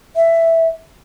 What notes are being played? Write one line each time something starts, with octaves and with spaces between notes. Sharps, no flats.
E5